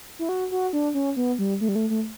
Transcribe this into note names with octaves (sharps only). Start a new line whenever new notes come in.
E4
F#4
F#4
D4
C#4
B3
G3
A3
G3
A3
A3